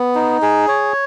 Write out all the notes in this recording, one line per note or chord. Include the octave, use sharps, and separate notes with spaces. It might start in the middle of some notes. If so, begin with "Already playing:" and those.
Already playing: B3
D#4
G#4
C#5